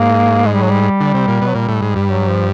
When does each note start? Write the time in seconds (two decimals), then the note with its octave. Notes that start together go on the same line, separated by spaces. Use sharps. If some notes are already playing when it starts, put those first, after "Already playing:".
Already playing: G#2 A#3
0.46 G#3
0.54 G3
0.61 F#3
0.70 G3
1.00 D3
1.14 C3
1.28 A#2
1.41 B2
1.47 F#3
1.55 A#2 G3
1.68 A2
1.82 G#2
1.96 G2
2.09 F#3
2.28 F3